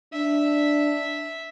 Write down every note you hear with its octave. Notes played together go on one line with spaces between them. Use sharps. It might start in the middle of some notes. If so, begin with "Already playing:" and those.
D4 E5